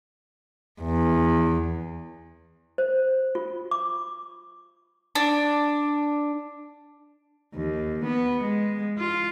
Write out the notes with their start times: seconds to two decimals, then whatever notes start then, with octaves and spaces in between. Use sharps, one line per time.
0.82 E2
2.78 C5
3.35 F4
3.71 D6
5.15 D4
7.55 D#2
8.05 B3
8.44 G#3
8.98 F4